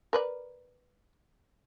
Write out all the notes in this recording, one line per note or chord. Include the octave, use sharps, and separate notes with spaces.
A#4 B4 D5